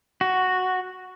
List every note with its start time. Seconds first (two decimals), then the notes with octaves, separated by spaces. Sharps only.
0.21 F#4